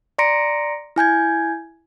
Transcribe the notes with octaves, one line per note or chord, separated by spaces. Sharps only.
D5 A#5 C6 A#6 C#7 D7
E4 G#5 G6 G#6